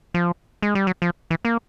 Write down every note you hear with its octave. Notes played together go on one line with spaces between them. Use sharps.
F3
G#3
G3
F#3
F3
E3
A#3